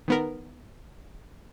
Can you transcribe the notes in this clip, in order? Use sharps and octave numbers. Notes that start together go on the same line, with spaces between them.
D#3 B3 A#4